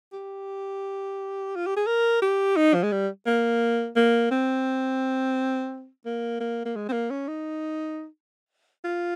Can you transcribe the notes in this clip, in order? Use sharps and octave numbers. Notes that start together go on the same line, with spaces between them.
G4
F4
G4
G#4
A#4
G4
D#4
F3
G#3
G3
A#3
A#3
C4
A#3
A#3
A#3
G#3
C4
A#3
C#4
D#4
F4